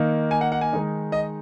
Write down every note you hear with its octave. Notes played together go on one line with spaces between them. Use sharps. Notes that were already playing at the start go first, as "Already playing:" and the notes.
Already playing: D#3 A#3 D#4
G#5
F#5
F#5
G#5
D#3 G#3 D#4
D#5